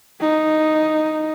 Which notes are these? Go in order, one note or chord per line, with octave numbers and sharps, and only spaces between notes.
D#4